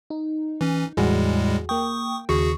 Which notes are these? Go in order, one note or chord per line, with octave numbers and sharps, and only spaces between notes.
D#4
E3 C#4
E2 A2 G3 G#3 F#4 G#4
A#3 G5 C#6 D#6
D#2 C#3 F#4 G#4 C#6